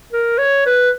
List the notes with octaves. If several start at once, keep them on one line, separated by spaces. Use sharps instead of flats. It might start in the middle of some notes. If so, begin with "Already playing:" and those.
A#4
C#5
B4